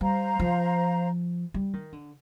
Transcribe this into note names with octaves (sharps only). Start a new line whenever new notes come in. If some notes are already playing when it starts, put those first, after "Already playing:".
G3 C5 F5 A#5
F3
G3
D#3
D3